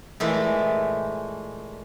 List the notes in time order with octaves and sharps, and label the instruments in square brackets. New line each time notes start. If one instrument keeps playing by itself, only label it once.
[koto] A#2 E3 G#3 A3